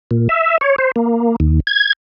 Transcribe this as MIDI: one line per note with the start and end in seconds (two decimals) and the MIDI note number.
0.11 0.28 46
0.29 0.58 76
0.61 0.76 73
0.78 0.91 72
0.96 1.36 58
1.40 1.60 39
1.67 1.93 92